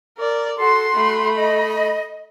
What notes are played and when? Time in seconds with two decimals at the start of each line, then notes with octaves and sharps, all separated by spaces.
0.18 A#4 D5
0.58 F#4 A4 C6
0.95 A3 B5
1.36 D#5